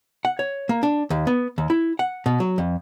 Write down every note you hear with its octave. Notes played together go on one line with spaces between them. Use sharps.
F#5
C#5
A#3
D4
D#2
B3
D#2
E4
F#5
B2
F#3
F2